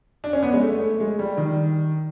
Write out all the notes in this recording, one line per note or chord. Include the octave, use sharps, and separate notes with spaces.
D4
C#4
B3
G#3
A3
G#3
G3
D#3